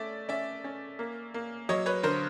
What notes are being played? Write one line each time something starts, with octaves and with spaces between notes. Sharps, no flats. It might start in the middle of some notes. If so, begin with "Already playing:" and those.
Already playing: A3 C#4 D5 E5
C#4 D5 E5
C#4
A#3
A#3
F#3 C#5 D#5
B4 C#5
D3 A#4 C5